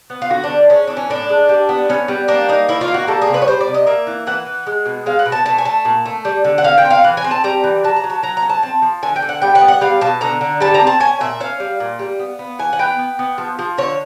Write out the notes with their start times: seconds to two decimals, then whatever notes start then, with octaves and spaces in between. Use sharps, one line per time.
0.10 B3
0.22 F4
0.30 D3 F#4
0.44 D4
0.50 G3
0.70 G#3 C#4
0.87 E3 D4
0.97 C#4
1.10 A2 D4
1.29 G#3
1.49 G3
1.69 B3
1.89 B3 C#4
2.08 G3
2.28 A#3 D4
2.49 A#3 D#4
2.69 D#3 E4
2.81 F4
2.88 A#3
2.94 F#4
3.07 G3 A4
3.22 G#4
3.28 C3
3.34 B4
3.42 C#5
3.47 G3 C5
3.61 D5
3.67 C3
3.74 D#5
3.87 A#3 E5
4.07 E3
4.27 E3 F#5
4.46 E3
4.67 G#3
4.86 B2
5.06 G#3 F5
5.19 F#5
5.26 B2
5.32 A5
5.46 A3 A5
5.58 G#5
5.65 A3 A5
5.85 A#2
6.05 A3
6.25 G3
6.44 D3
6.58 F#5
6.64 D3 F5
6.78 G5
6.85 C4
6.90 F5
7.04 E3 F#5
7.17 G#5
7.24 C4
7.31 A5
7.44 G3 A#5
7.64 E3
7.84 F#3 A5
7.96 A#5
8.04 F#3
8.10 A5
8.23 F#3 A#5
8.37 A#5
8.43 C#4
8.49 A5
8.63 C4 A5
8.82 F3
9.02 D3 G#5
9.16 G5
9.22 D3
9.29 F#5
9.42 G3 G5
9.55 F#5
9.61 B3
9.68 F#5
9.81 G3 F5
10.01 B2 A5
10.21 D3 A#5
10.41 D3
10.60 G3 A5
10.74 A#5
10.81 C4
10.87 A5
11.00 C#4 G#5
11.20 A#2 E5
11.40 C#4 F5
11.60 G3
11.80 A#2
11.99 G3
12.19 B3
12.39 B3
12.59 E3 G#5
12.73 F#5
12.79 B3 G5
12.99 B3
13.19 B3
13.38 F3
13.59 F3
13.78 D3 C#5